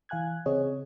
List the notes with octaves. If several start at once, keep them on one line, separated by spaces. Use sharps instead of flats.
E3 F5 G#5 F#6 G#6
C#3 C4 G#4 C#5 D#5